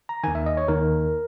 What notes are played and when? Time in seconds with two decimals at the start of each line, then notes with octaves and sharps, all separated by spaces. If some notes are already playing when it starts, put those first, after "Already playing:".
0.09 A#5
0.24 D#2 D#3 G#5
0.35 E5
0.46 D#5
0.57 C#5
0.68 D#2 D#3 A#4